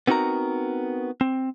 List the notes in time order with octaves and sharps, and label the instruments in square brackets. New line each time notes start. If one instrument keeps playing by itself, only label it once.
[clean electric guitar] B3 C4 D#4 F#4 A#4 A#5
C4